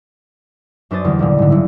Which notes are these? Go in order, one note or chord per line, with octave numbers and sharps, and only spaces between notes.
F#2 D4 B4 C5 D#6 A6
E2 D3 G3
C#2 A#2 D3
G#2 D3
F#1 E4